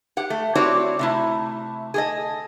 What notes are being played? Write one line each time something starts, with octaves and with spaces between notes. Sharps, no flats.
G4 F#5
A3
C4 E4 F#4 G4 C#5 D5
C3 A3 E4
G#4 A4 D#5